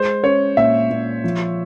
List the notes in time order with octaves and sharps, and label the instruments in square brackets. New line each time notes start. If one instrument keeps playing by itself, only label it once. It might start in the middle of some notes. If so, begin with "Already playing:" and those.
Already playing: [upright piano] G#3 [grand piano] C5
[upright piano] C#4 [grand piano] C#5
[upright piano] A#2 [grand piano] E5
[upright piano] A#2
F3